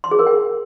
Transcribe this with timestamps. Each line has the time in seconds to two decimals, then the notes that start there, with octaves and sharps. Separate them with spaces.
0.04 C6
0.11 G#4
0.19 A#4
0.27 G5